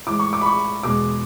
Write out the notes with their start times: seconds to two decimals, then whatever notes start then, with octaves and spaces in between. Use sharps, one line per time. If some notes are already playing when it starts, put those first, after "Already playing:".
0.07 A2 E3 G#3 D6
0.20 C#6
0.33 D6
0.41 B5
0.46 C#6
0.83 E2 B2 G#3 D6